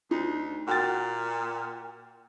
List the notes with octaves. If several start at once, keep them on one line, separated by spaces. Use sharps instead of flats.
D2 D#4
A#2 F#4 G5 A6